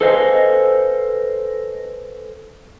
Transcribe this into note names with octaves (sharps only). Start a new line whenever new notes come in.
A4 B4 C5 D#5 F5 G#5